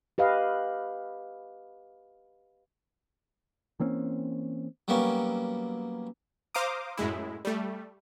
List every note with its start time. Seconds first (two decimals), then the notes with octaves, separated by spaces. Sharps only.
0.18 G4 B4 D#5 F5
3.80 E3 A#3 C4 C#4
4.88 F#3 G3 A#3 B3 C#4
6.55 C5 F5 A#5 D6 D#6
6.97 F#2 A2 G#3 E4
7.45 G3 A3